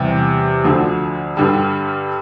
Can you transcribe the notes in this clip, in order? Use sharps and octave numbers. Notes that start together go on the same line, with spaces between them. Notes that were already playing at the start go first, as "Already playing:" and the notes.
Already playing: E2 C3 G3
D2 D3 F3
G2 D3 G3